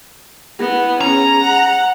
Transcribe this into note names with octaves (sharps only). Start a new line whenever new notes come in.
B3 E4
C#4 G#4 A#5
F#5